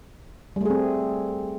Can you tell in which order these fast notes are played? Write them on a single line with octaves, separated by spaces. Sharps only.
G3 A3 G#4 C4